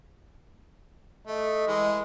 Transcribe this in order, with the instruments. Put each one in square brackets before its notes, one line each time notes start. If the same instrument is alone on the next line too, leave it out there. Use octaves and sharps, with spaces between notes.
[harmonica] A3 [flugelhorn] D#5
[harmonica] E3 G#3